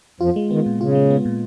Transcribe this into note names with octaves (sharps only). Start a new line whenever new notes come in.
F2 F3 F4
G#3
D#3 B3
A#2
C#3 F4
G#3
B3
A#2